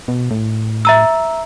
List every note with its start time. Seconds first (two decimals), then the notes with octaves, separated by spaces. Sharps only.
0.08 B2
0.31 A2
0.85 E5 A#5 E6